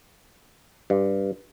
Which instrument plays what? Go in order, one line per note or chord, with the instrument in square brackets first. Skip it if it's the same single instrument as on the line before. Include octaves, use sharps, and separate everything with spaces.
[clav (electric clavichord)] G2